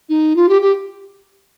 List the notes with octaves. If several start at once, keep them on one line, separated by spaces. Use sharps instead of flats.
D#4
F4
G4
G4